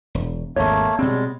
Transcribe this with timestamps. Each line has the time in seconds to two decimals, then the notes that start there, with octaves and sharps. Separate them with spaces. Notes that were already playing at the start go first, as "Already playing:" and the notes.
0.15 E1
0.56 G#1 E2 A3 A#3 C#5
0.99 B2 G3 G#3 C4